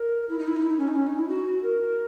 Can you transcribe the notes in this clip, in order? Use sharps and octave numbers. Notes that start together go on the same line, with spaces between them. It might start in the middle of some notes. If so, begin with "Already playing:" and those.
Already playing: A#4
E4
D#4
E4
D#4
E4
D#4
C#4
D#4
C#4
D#4
E4
F#4
A#4